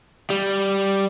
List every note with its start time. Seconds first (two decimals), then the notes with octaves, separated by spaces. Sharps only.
0.30 G3